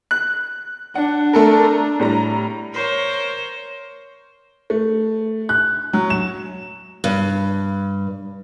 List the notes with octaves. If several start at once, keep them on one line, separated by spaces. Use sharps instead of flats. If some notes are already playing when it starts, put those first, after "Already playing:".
F#6
D4 F#5
A3 A4 A#4
A#5
A2 G3 A#5
A#4 C5 C#5
A3
F#6
F#3
E7
G2